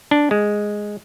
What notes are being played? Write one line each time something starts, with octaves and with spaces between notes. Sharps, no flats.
D4
G#3